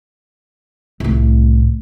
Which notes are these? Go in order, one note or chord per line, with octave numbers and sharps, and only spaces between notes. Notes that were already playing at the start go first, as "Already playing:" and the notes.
C2 A2